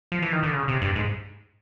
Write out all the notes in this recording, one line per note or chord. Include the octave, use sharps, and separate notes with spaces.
F3
E3
D#3
D3
C#3
C3
G2
G#2